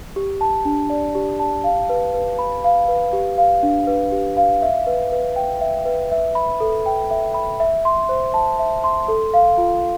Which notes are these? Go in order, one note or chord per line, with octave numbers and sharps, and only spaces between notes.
G4
A5
D4
D5
G4
A5
F5
B4
B4
B5
F5
B4
G4
F5
D4
B4
G4
F5
E5
B4
B4
G5
E5
B4
E5
B5
A4
G5
E5
B5
E5
C6
C5
A5
E5
C6
A4
F5
F4